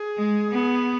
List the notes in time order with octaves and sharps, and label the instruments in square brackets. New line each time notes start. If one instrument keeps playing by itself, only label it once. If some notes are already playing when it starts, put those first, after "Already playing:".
Already playing: [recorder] G#4
[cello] G#3
B3